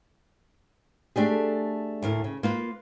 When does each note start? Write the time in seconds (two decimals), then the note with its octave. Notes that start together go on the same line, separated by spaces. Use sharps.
1.16 A3 D4 G4 G#4
2.03 D2 A2 A#4
2.24 C#3
2.43 A#3 F4 B4